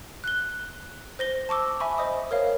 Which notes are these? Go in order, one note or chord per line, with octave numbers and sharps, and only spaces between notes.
F#6 G7
C5 A#6 G7
A5 C#6 D6 E6
E5 G#5 B5 C#6
C5 D#5 D#6
A#4 C#5 F5